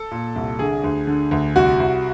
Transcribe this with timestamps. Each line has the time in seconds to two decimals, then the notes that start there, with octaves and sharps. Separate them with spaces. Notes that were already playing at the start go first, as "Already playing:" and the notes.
Already playing: A4
0.11 A#2
0.36 C2
0.59 D3 G#4
0.84 D2
1.07 D3
1.31 D2
1.56 C2 F#4
1.80 C2